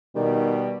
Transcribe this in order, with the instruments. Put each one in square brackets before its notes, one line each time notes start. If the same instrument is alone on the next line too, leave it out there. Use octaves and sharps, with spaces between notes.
[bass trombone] B2 [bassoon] D#3 [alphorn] G3